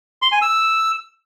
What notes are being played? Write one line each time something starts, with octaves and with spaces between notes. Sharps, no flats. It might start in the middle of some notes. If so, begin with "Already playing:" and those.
C6
G#5
E6